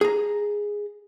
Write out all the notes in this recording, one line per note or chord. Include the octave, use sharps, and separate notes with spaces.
G#4 A#5